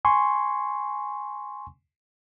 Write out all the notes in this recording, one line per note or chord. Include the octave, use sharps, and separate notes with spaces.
G#5 C6 C#6